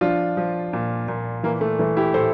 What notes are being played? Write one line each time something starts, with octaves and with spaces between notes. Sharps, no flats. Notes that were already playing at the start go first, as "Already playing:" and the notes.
F3 D4 F4
F3
A#2
A#2
E3 A#3
A3
E3 A3
E4 G4
A2 A4 C5